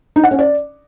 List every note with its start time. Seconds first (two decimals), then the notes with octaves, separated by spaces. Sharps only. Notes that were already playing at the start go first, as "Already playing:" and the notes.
0.16 D#4
0.24 F#5
0.31 C#4
0.39 D5